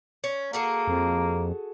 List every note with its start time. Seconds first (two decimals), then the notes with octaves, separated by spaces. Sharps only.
0.24 C#4
0.53 A#3 F#4 G#4 A4
0.88 F2